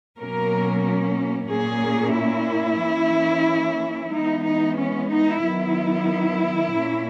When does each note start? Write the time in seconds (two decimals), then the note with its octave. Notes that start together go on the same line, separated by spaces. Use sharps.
0.18 B2 F#3 A#3 C#4 A#4
1.50 A#2 A#3 C#4 G#4
2.16 E4
2.81 E3 A#3 C#4
4.13 E3 G#3 B3 D#4
4.46 D#4
4.79 C#4
5.12 D#4
5.45 D#3 F#3 B3 E4
6.77 A#2 A#3 C#4